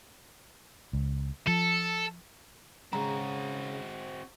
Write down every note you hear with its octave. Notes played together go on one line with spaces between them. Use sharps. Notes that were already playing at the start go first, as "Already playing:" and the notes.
C#2
F3 A4
C#3 G#3 C4 F#4 A#5